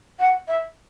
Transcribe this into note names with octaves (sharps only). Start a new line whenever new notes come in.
F#5
E5